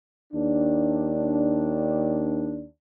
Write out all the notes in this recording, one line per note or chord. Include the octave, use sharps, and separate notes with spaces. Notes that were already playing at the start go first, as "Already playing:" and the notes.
D#2 D4